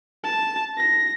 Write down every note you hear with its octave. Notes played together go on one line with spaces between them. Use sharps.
A5
A#6